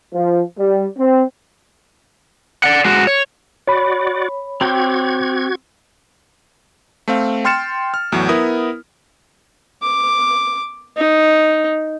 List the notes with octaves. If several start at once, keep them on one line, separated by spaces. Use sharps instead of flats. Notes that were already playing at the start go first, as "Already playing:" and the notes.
F3
G3
C4
D5 F#5
G#3 F#4
C#5
F#4 C#5 D5 B5
C4 F#4 G4 G5 G#6
A3 C4 F5
G5 C6 F6 A6 C#7 E7
F6
E2 A2 F#3
B3 E4 A#4 D#6
D6
D#4